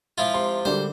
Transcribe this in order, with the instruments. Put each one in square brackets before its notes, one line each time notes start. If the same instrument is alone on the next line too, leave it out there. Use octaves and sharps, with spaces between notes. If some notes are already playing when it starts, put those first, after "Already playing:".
[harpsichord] F3 E4 F4 [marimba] G#3 E5
[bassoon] C3 [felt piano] C6
[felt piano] D3 G3 [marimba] D4 F#4 A#4 [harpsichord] C5